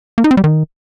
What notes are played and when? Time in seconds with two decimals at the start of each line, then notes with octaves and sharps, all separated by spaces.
0.18 A#3
0.24 D#4
0.31 C4
0.37 G3
0.44 D#3